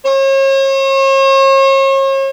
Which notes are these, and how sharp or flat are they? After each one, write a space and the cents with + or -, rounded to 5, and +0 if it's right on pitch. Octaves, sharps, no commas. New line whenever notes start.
C#5 -40